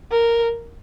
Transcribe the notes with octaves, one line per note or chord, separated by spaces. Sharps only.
A#4